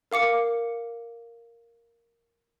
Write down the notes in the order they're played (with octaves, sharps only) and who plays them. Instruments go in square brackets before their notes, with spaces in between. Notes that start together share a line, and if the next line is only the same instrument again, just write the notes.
[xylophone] A#4 F5 D6 C#7